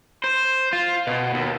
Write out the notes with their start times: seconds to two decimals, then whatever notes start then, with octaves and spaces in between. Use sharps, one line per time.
0.24 C5
0.73 F4
1.07 B2
1.34 D#2